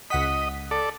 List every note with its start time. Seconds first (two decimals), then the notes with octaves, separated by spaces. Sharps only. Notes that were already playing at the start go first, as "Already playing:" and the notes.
0.10 C#2 D#5 F#5 B6
0.71 A4 D5